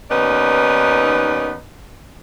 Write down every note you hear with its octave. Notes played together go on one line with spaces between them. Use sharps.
D#2 B3 C#4 D#4 B4 D5